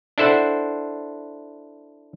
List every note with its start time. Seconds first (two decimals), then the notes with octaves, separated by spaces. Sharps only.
0.18 D4 E4 A4 C5 F#5